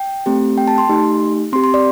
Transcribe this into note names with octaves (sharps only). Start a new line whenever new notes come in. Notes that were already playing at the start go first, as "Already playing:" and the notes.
Already playing: G5
A3 C4 G4
G5
A5
C6
A3 D#4 G4
C4 G4 C6
C6
D5